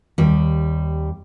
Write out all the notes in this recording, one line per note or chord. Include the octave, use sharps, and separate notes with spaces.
D#2 G3